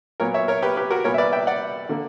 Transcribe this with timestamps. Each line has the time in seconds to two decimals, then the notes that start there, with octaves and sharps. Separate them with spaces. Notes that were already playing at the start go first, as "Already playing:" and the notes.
0.20 A#2 F#3 B3 A#4 C#5
0.34 C#5 E5
0.48 A#4 C#5
0.62 G4 B4
0.77 G4 B4
0.90 F#4 A#4
1.04 A#2 G3 B3 A#4 C#5
1.14 E5
1.18 B4 D5
1.32 E5 G5
1.47 D5 F#5
1.89 D3 A#3